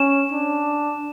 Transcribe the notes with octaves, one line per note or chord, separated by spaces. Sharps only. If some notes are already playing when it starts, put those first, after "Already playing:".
Already playing: C#4 E7
D4